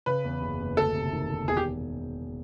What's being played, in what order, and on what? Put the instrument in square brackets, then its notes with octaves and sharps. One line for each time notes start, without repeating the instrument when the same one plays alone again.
[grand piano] C#3 [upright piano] B4
[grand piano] E2
F#1
F#1
[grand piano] D2 [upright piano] A4
[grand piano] C3
D#3
D#3
[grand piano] E1 [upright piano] G#4
[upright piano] G4